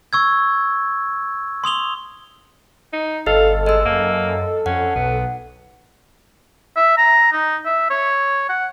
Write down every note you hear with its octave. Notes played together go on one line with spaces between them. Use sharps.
C#6 E6 G#6
C6 D#6 F7 G7
D#4
G1 A4 D#5 F5
G#3 D#5 E6
F#2 A#3
F2 C#4 F#5
B1 B3
E5
A#5
D#4
E5
C#5
F#5